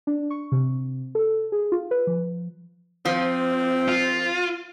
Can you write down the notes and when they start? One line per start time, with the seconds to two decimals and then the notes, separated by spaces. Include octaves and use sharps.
0.07 D4
0.30 C#6
0.52 C3
1.15 A4
1.52 G#4
1.72 F4
1.91 B4
2.07 F3
3.06 F3 C4
3.89 F4